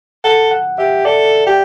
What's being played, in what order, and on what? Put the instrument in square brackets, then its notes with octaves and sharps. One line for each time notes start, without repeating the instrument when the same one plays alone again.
[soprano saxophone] A4 [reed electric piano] F#5
[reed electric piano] F#5
[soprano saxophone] G4 [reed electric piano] E5
[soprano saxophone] A4 [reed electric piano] D5
[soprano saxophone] G4